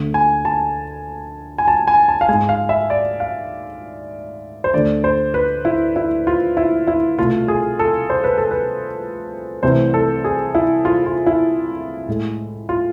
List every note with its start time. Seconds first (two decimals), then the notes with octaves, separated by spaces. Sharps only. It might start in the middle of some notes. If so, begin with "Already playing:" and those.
Already playing: D2 D3 A3
0.14 G#5
0.45 A5
1.58 G#5
1.68 A5
1.87 G#5
2.08 A5
2.21 F5
2.29 G#3 G#5
2.33 G#2
2.49 F5
2.69 E5
2.90 D5
3.20 F5
4.64 C5
4.74 D2 D3 A3 D5
5.04 C5
5.34 B4
5.65 E4
5.96 E4
6.27 F4
6.57 E4
6.87 E4
7.19 C2 B2 A3 F4
7.48 G#4
7.79 A4
8.10 C5
8.24 B4
8.38 A4
8.51 B4
9.63 C2 C3 E3 A3 C5
9.94 A4
10.24 G#4
10.55 E4
10.85 F4
11.06 F4
11.26 E4
12.08 A2 G#3
12.69 F4